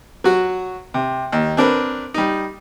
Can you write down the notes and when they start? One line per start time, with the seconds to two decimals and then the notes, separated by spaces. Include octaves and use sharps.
0.24 F#3 F#4
0.94 C3
1.32 D#2
1.57 C4 D4 A#4 B4
2.14 G3 D#4